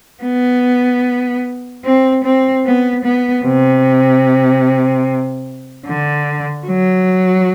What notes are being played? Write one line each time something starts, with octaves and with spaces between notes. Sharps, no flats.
B3
C4
C4
B3
B3
C3
D3
F#3